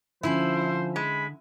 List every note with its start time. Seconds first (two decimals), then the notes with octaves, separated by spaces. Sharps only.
0.23 D3 F3 C#4 E4 C5 G#5
0.96 G#3 B5